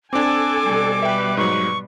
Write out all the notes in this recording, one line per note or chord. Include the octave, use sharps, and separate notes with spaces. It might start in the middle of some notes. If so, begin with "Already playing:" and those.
C4 D4 A4 G#5 D6
B2 G3
B4 E5 G5
G#2 F#3 C#6